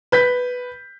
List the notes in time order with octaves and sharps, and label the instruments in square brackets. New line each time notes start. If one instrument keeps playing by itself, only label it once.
[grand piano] B4 G6 B6